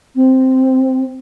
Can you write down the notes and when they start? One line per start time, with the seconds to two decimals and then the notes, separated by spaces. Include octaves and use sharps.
0.15 C4